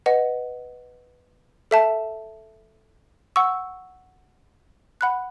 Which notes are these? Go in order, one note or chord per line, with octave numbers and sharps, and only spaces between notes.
B4 D#5 F#5
A4 E5 A5
F#5 C#6 E6
F#5 B5 F#6